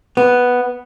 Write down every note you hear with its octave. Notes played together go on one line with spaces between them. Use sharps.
B3